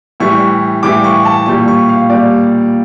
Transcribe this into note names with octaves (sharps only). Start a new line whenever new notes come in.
A2 E3 G3 C#6
A2 E3 G3 D6
C#6
A5
A#2 G3 C#6
C#6
F5
A#2 G3 D5